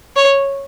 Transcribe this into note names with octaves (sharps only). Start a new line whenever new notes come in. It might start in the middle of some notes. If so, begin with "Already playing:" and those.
C#5